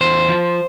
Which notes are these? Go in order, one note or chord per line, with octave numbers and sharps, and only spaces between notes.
E2 C5
F3